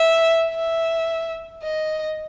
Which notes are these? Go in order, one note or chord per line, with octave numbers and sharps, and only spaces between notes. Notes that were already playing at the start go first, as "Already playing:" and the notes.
Already playing: E5
E5
D#5